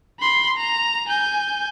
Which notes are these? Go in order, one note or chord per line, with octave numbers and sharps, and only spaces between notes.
B5 C6
A#5
G#5 G6